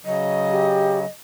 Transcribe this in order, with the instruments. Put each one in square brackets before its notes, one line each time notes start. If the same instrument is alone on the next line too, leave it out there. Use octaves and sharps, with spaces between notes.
[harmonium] C#3 F#3 [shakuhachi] D#5
[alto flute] G4